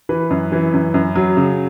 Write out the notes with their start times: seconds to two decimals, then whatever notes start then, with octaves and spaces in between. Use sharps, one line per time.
0.09 E3 B4
0.30 F#2
0.52 E3
0.73 F#2
0.94 F#2
1.16 F#3
1.37 C#3